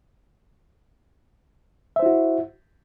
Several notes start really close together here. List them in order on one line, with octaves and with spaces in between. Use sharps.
E5 C5 E4 F#4